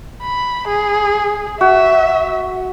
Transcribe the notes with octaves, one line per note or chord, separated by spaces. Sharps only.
B5
G#4
F#4 E5